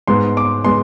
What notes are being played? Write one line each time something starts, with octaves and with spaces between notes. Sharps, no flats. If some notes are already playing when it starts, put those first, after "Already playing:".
G#2 G#3 B3 C6
D6
G#3 B3 C6